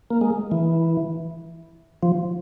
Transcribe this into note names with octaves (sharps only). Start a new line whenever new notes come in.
A#3
G#3
E3
F3